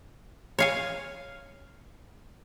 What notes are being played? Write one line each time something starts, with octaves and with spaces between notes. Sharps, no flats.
C#5 F5 G#5